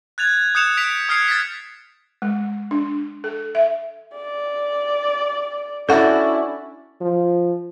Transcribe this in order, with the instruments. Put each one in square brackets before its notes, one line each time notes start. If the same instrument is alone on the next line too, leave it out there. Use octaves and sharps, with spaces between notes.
[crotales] F#6 G#6 A6 F7
D#6 F#6 G6 C#7 E7 F7
B6 D7 F7
D#6 F6 G#6 C7 C#7
A6 B6
[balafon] G#3
D4
A4
E5
[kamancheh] D5
[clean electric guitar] C#4 D4 F#4 [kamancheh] E4 [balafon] A4 F#5
[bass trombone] F3